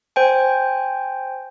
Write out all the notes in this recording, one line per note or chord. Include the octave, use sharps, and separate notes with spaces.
C5 G5 G#5